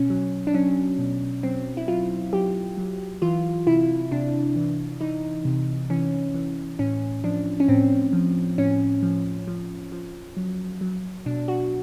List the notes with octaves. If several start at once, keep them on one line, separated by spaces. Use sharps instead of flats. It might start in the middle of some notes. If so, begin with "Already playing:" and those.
Already playing: B2 C#4
F#3
D4
F#3 C#4
B2
F#3 C4
E4
F#3 F4
F#3 G4
F#3
E3 F4
C3 E4
C3 D4
E3
E3 D#4
C3
E3 C#4
E3
A2 C#4
F3 D4
C#4
A2 C4
F3
A2 C#4
F3
F3
F3
F#3
F#3
B2 D4
F#4